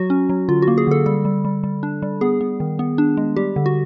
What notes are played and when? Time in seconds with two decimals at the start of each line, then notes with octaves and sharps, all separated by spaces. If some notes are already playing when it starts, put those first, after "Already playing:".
Already playing: F#3 F#4
0.10 C#4
0.29 F#3
0.48 D3 F4
0.62 F#4
0.68 A#3
0.78 G#4
0.87 D3 A4
1.06 G3 A4
1.25 G3
1.45 G3
1.64 G3
1.83 D4
2.02 G3
2.21 B3 G#4
2.41 B3
2.60 D#3
2.79 B3
2.98 D4
3.17 G#3
3.36 G3 G4
3.56 D3
3.66 F#4